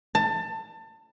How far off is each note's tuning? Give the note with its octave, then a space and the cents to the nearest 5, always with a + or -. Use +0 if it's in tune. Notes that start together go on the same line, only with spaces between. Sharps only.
A5 +25